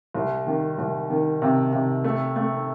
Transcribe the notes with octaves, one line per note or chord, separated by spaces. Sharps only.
C2
D#3
C2
D#3
C3
C3
A3
A3